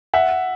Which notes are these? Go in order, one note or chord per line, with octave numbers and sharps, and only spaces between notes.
E5 F#5